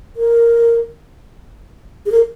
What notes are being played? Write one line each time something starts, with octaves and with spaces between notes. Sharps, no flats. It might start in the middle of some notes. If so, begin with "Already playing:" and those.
A#4
G#4
A#4